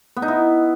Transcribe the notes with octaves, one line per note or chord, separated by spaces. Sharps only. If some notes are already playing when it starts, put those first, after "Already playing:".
B3
D#4
E4